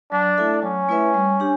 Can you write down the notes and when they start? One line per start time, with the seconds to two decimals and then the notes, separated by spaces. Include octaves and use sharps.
0.12 F#3 D4
0.37 A3 E4 A4 E5
0.62 F#3 C#4
0.89 A3 E4 B4 E5
1.14 G3
1.40 D4 G4